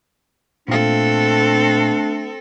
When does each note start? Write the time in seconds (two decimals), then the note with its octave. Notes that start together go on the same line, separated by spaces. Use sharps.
0.68 A#2 A3 C4 D4 A4 F5